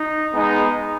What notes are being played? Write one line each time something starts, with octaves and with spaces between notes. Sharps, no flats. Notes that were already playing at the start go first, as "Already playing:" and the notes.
Already playing: D#4
G#3 B3 D#4